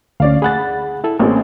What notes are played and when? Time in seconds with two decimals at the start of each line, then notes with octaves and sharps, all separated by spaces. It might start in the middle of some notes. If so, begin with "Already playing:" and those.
0.20 D2 C#4 D5 F5
0.42 G#4 F#5 B5 A6
1.04 E4 A4
1.19 A1 A#3 C4 C#4 G#4